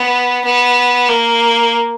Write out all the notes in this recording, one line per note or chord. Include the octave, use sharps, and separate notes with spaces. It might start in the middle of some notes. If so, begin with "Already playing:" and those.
Already playing: B3
B3
A#3